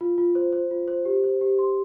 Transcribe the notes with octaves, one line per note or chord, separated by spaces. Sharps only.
F4
F4
C5
C5
F4
C5
G4
C5
G4
C6